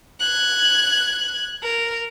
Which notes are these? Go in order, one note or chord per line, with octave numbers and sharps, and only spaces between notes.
F#6 G#6
A#4